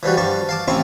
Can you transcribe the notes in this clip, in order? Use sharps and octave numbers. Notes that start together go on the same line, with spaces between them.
E3 F3 G3 F#4
G2 F3 A5 C#6
F5 A5 D6
A1 C4 E4 F4 C#6